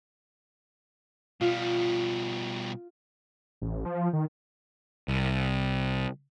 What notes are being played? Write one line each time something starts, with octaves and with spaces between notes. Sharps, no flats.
B2 G3 F4
A1
F3
D#3
C2